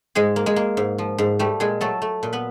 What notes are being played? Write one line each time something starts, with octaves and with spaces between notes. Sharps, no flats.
G#2 G#3 G#4
A#3
G#3 G#4
A#3
G#2
F3
G#2
G3 A3 G4
A#2 G#3 G#4
F#3 A3 A4
A3
A#2
B3 B4